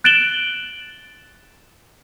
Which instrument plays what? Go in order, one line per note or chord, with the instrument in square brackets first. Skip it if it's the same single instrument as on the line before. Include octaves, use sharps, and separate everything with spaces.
[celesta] F#6 A6 D7 E7 F#7 G7